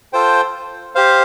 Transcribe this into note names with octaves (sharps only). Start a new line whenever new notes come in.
F4 A4 C5 G5
G4 C5 F5